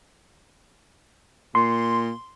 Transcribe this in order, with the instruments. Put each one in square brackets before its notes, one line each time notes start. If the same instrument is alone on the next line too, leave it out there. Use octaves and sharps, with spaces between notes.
[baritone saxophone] A#2 [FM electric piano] C6